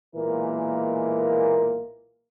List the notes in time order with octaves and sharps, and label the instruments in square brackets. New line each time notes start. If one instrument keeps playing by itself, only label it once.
[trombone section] B1 A#2 E3 G#3 A#3 A#4